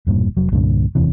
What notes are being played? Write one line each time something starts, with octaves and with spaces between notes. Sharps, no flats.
E1 G2 A#2
F1 F#3
C2 G2 A#2 D3
F1 D#2 C3 E3